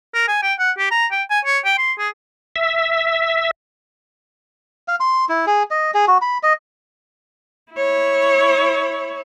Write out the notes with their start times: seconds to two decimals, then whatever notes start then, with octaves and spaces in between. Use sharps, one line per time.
0.14 A#4
0.28 G#5
0.43 G5
0.59 F#5
0.78 G4
0.91 A#5
1.12 G5
1.30 G#5
1.45 C#5
1.65 G5
1.78 C6
1.99 G#4
2.56 E5
4.88 F5
5.00 C6
5.29 E4
5.47 G#4
5.71 D#5
5.94 G#4
6.08 F#4
6.21 B5
6.43 D#5
7.73 E4 C#5